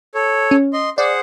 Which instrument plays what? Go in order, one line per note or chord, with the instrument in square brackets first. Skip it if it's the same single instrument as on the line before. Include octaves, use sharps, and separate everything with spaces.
[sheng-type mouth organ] A4 C#5
[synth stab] C#4
[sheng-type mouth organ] D#5 C6
[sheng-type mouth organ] G#4 C5 F#5 [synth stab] D5